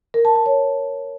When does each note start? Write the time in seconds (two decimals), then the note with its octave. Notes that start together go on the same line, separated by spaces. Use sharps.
0.14 A#4
0.25 A5
0.35 A5
0.46 C#5